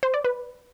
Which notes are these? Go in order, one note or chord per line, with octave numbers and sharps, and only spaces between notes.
C5
D5
B4